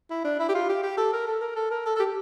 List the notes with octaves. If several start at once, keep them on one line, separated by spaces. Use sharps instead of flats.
E4
D4
E4
G4
F4
G4
G4
A4
A#4
A4
A#4
A4
A#4
A4
A4
G4